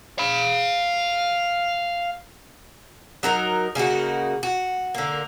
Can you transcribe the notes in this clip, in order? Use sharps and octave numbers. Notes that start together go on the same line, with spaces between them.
F5 B5
F#3 D#4 A#4 A#5
C#3 A#3 D#4 F#4
F#4
D3 A#3